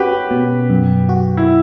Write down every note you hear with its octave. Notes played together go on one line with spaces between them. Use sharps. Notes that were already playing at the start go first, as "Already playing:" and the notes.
Already playing: C#4 F#4 G4 B4
B2
F#2
F#4
E4